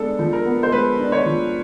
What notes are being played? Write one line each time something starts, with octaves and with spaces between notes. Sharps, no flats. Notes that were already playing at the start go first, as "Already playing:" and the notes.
Already playing: G#3 B3 D4 A4
F3
A#4
B3
C5
G#3 B4
D4
C#5
F3